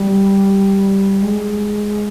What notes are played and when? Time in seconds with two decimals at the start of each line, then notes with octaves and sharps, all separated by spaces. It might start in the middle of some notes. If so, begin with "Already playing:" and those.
Already playing: G3
1.22 G#3